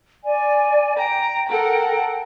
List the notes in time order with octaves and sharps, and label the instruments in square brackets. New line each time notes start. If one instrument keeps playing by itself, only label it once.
[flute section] D5 G#5
[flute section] G5 [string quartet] A#5
[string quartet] A4 A#4 F#5